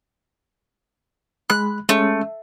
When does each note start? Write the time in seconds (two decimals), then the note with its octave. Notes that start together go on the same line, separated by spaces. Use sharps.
1.50 G#3 B5 F#6
1.89 G#3 A3 C#4